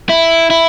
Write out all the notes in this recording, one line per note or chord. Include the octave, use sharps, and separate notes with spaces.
E4
E4